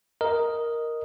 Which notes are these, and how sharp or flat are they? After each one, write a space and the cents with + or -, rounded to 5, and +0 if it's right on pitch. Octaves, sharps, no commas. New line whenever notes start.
A#4 +0 D#5 +0